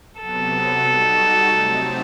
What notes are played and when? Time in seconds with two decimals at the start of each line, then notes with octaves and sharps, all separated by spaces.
0.20 C3 F#3 B3 A4
0.84 G3 D#4 F#4
1.50 C3 F#3 A3 C4 D#4